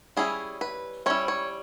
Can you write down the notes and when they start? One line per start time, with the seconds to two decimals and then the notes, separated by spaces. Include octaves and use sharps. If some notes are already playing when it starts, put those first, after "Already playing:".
0.17 G3 C#4 E4 G#4
0.61 B4
1.06 G3 C#4 E4 C#5
1.28 C#5